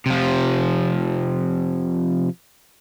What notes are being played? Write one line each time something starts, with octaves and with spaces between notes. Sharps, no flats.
C3 F3